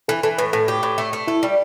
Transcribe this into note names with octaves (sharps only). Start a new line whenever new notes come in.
E3 A4
E3 A4
A2 B4
A2 A4
G4
A2
A3
A3
E4 A4
G3